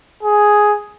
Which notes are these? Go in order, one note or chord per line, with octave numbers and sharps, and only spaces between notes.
G#4